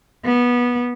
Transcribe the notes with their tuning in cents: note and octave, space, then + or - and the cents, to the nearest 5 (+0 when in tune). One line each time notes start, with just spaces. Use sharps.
B3 -20